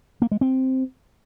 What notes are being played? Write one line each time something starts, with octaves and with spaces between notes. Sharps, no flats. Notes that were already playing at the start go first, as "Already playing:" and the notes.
A#3
G#3
C4